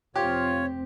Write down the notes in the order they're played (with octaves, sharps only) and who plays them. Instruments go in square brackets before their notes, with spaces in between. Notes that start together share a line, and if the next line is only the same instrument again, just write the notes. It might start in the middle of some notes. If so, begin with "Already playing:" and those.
[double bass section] F1 C4 [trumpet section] F4 [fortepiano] G4 [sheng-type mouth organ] C#5